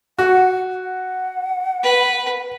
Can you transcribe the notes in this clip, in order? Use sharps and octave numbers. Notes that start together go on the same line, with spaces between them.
F#4 F#5
F#5
B4